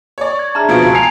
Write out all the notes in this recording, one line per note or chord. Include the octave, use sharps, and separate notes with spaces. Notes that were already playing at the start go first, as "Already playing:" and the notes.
C#5 D5 C#6
G#6
D4 G#4 E5 A5 A#5 F6
B2 F3 B4 G#6 D7
C#2 B2 A5
G#5 A#5 C7 F7